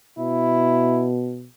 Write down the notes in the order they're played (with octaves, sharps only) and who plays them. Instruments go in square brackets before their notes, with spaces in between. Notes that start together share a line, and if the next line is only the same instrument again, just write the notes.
[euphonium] B2 [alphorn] E4